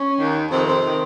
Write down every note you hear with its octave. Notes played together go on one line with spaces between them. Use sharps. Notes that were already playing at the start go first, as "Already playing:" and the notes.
Already playing: C#4
D#2 D#3
F2 C3 D#3 C4
C4
C3 D#3